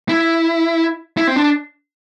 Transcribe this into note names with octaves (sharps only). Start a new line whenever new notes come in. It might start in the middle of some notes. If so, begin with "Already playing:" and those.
E4
E4
C4
D4